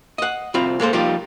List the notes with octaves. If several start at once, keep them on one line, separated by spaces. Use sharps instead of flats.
D#5 F#5
C2 C4 F4 B5
G#3 A#3 A4 C5
F3 G3 A#3 D#4 F4 G4